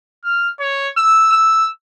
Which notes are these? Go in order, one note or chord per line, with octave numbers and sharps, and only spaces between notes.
F6
C#5
E6
E6